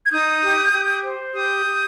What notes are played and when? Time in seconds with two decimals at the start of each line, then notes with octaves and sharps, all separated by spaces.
0.05 G#6
0.11 D#4 D#6 G6
0.42 G4
0.73 G4
1.04 C5
1.34 G4 D#6 G6
1.66 G4